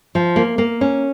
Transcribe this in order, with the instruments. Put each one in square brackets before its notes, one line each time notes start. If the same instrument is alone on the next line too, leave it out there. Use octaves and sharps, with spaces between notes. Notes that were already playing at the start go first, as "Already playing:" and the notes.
[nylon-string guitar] F3
A#3
A#3
C#4